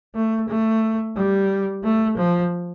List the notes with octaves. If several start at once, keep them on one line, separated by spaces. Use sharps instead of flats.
A3
A3
G3
A3
F3